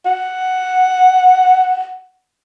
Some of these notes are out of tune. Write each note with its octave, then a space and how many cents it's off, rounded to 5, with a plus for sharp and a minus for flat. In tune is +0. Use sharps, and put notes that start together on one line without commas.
F#5 +0